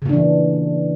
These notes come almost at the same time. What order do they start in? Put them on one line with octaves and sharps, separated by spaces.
C#3 A#2 D4 E3